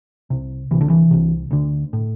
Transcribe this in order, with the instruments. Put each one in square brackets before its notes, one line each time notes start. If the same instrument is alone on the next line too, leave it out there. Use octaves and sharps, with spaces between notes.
[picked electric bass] C2 C3
C2 C3 E3
D3
E3
C2 C3
D2 D3
A2